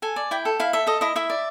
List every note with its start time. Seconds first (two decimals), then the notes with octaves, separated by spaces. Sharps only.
0.02 A4 G#5
0.16 D5
0.31 E4 G5
0.45 A4
0.60 E4 F5
0.73 A4 E5
0.87 A4 D#5
1.01 E4 D#5
1.16 E4 E5
1.30 D5